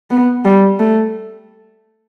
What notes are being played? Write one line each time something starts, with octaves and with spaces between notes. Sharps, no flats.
B3
G3
A3